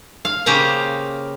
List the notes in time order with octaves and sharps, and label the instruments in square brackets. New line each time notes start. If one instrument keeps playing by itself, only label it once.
[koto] F5
C#3 A#3 G4 C5 F5 A#5